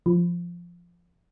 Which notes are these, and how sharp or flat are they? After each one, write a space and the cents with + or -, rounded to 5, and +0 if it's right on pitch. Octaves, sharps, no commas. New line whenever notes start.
F3 -5